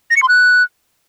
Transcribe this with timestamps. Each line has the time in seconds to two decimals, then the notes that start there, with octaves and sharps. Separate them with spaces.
0.10 A#6
0.16 C#7
0.22 C6
0.28 F#6